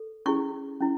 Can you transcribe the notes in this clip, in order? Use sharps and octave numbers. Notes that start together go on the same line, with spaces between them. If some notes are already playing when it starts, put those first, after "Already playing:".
Already playing: A4
C#4 E4 G#4 C#6
C#4 E4